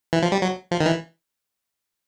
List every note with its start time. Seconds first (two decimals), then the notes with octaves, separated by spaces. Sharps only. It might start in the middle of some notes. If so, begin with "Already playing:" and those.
0.13 E3
0.22 F3
0.32 G3
0.42 F#3
0.71 F3
0.81 D#3
0.86 E3